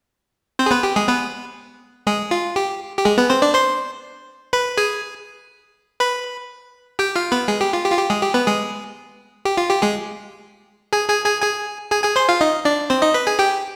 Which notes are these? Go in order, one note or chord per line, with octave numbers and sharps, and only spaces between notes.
C4 C5
G#4
B3 B4
G4
G#3 G#4
B3 B4
G#3 G#4
F4
G4
G4
G#3 G#4
B3 B4
C4 C5
D4 D5
C5 C6
B4 B5
G#4 G#5
B4 B5
G4 G5
F4 F5
B3 B4
G#3 G#4
G4
F4
G4
F4
G4
G#3 G#4
G4
B3 B4
G#3 G#4
G4
F4
G4
G#3 G#4
G#4 G#5
G#4 G#5
G#4 G#5
G#4 G#5
G#4 G#5
G#4 G#5
C5 C6
F4 F5
D#4 D#5
D4 D5
C4 C5
D#4 D#5
B4 B5
G#4 G#5
G4 G5